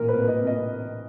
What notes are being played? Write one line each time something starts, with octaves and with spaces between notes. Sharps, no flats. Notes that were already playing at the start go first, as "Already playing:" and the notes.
Already playing: A1 A#2 A#4
B4
C2
D#5
C2
D#5